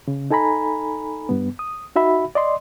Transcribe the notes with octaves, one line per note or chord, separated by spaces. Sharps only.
C#3
D#4 A4 G#5 A#5 B5
G2 B3
D#6
D#4 F#4 E5 B5
D5 D#5 C6